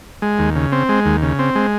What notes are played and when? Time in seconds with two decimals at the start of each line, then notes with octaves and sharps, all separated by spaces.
0.22 G#3
0.39 D#2
0.56 C#3
0.72 C4
0.89 G#3
1.05 D#2
1.22 C#3
1.39 C4
1.55 G#3